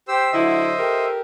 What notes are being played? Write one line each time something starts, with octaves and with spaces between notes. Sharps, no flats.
G4 C5 E6
D3 F#3 E4 C5 D#5 E5
G4 A4 A#4